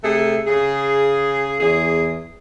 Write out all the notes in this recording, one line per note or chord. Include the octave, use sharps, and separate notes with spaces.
C3 A3 G#4 A4
C#3 G#4
E2 G#4